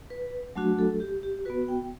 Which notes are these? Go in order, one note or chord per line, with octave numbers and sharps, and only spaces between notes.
B4
F#3 A3 D4 F#4
A4
G4
G4
B3 F#4 B4
G5